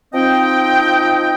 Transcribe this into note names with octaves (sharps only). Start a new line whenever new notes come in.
F3 C4 D#4 D#5 G5